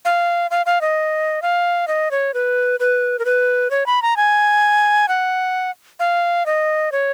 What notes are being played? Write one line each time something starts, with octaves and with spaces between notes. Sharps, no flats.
F5
F5
F5
D#5
F5
D#5
C#5
B4
B4
A#4
B4
C#5
B5
A#5
G#5
F#5
F5
D#5
C#5